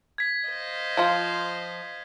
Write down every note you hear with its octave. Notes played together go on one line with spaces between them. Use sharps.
G#6 B6
C5 D#5 F5
F3 F4